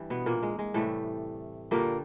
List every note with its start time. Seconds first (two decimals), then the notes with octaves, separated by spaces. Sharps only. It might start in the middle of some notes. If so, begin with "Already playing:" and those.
Already playing: G2 E3 G3
0.10 B2 B3
0.26 A#2 A#3
0.43 G#3
0.59 G#3
0.74 A2 C3 E3 G3 A3
1.71 G2 A#2 D3 G3 A#3